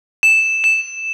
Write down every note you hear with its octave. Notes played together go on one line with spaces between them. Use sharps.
E7
E7